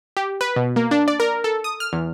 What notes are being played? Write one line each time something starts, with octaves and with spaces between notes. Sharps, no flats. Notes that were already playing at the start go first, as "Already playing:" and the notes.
G4
B4
B2
A#3
D4
D5
A#4
A4
D#6
F6
E2